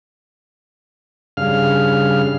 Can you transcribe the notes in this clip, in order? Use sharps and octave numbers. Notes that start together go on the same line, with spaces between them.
G2 C#3 F5 F6